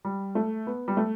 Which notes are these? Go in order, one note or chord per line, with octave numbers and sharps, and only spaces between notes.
G3
A3
B3
G3
A3